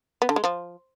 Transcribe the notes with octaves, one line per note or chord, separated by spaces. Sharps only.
B3
D3
G#3
F3